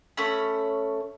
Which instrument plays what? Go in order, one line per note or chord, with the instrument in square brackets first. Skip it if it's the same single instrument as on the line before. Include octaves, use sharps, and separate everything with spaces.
[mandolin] A3 C#4 B5